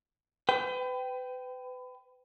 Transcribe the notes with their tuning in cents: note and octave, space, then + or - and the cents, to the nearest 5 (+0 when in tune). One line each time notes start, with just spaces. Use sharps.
B4 +35 G5 -10